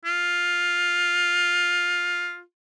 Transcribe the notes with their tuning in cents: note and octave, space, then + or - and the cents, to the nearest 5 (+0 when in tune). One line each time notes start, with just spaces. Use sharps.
F4 +10